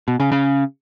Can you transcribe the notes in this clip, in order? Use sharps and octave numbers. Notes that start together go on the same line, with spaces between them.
B2
C#3
C#3